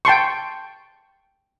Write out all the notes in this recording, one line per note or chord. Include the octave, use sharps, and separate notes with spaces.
G5 A5 C6 C#6